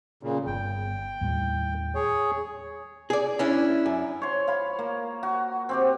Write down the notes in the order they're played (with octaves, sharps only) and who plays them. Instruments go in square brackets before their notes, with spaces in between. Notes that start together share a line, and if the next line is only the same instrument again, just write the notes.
[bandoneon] A#2 C#3
[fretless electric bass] G1 [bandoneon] G5
[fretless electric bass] D#2 A2 G3
[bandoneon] G#4 C#5
[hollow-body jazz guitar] G#4 D5
C#4 D4 E4
F#2
[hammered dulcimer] C#5 C6
F5 B5
A#3
F#4
C4 F#4 G4